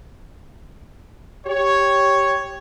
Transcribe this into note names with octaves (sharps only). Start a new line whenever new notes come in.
G4 C#5